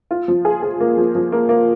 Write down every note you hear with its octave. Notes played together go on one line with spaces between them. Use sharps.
F4
F3
G#4
G#4
A#3
F3
F3
A#3
A#3